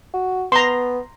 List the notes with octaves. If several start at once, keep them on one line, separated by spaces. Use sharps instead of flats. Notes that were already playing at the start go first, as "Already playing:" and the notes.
F#4
B3 A#5 C6